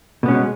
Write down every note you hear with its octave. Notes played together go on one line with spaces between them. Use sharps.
B2 G#3 B3 C#4